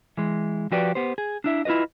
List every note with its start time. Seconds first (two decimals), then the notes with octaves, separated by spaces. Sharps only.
0.17 E3 G#3
0.72 F3 F#4 G4 B4 D5
0.95 B3 G4 C5
1.18 G#4
1.44 D4 E4 E5
1.65 E4 F4 G4 B4 D#5